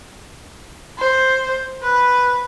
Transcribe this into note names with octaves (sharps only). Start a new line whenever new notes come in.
C5
B4